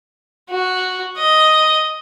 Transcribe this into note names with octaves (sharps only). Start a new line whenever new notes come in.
F#4
D#5